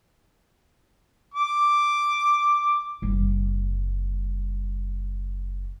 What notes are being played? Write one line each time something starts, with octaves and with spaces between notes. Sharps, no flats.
D6
F#1 G3